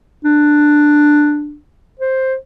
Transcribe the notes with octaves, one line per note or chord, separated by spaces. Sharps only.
D4
C5